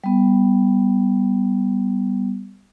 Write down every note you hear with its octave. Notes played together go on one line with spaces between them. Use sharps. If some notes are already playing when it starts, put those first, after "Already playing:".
G3 B3